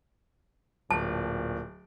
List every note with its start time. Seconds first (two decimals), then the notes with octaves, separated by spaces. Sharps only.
0.91 D1 A#2 A5